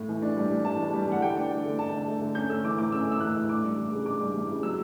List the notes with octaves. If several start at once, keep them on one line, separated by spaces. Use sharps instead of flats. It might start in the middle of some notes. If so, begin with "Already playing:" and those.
Already playing: A2
E3
D4
G3
E3
E3 A5
D4
G3
E3 F#5
D3 G5
D4
A3
D3
D3 A5
D4
A3
D3
C#4 G6
A3 E6
E3 D6
A2 D6
C#4 E6
A3
E6
E3 F#6
A2
D4 D6
G3
E3
C#3
D4 D6
G3
E3
C#3
F#3 E6